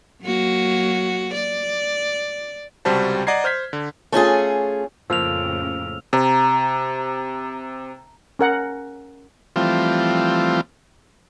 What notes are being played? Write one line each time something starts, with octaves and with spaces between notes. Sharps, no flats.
F#3 A#3 F#4
D5
C#2 C3 G3 F#4 C5 A5
D5 D#5 F#5 A#5 G#6 C7
C5 F6 G6 G#6 B6
D3
A3 C#4 F4 G#4
F2 A2 C#3 F3 A#3 E6 F6 F7
C3 A5 A#5
C#4 A#4 F#5
E3 F3 G3 A3 C4 F4